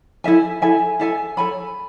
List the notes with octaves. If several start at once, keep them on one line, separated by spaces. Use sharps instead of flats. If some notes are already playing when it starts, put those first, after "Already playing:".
E4 A4 E5 G#5
E4 A4 E5 G#5
E4 A4 E5 G#5
A4 C#5 G#5 B5